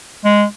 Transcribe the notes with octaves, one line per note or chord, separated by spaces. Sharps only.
G#3